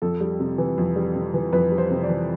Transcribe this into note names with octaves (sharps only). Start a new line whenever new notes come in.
F2 A4
G3
C3
E3
F2
G3
C3
E3
F2 B4
G3
C5
C3
D5
E3